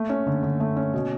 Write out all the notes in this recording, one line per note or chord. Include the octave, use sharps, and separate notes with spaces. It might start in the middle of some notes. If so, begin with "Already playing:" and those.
Already playing: A3
C#4
D3
D3
A3
C#4
B2